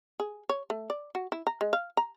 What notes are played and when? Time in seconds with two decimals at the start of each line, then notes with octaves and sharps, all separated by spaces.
0.20 G#4
0.49 C#5
0.70 A3
0.90 D5
1.15 F#4
1.32 E4
1.47 A#5
1.61 G#3
1.73 F5
1.97 A#5